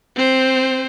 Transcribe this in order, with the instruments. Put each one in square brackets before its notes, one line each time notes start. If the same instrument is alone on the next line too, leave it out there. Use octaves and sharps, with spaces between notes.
[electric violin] C4 C5